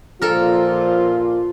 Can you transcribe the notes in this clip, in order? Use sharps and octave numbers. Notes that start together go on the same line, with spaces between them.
A#2 F3 F4 A4 A#4